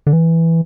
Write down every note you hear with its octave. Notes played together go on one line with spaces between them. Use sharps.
D3
E3